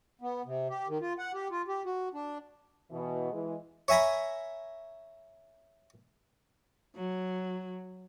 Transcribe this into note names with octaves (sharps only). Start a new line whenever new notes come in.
B3
C3
G4
D#3
F4
F#5
G4
F4
G4
F#4
D4
B2 E3
E3 G#3
C#5 E5 G#5 A#5 B5
F#3